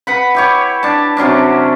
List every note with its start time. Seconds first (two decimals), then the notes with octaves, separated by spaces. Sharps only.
0.07 B4 F#5 B5
0.35 E4 G4 C#5
0.83 D4 A5
1.17 C3 F#3 C#4 D4